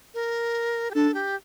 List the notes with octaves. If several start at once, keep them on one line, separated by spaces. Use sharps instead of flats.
A#4
G4
D4 A4
G4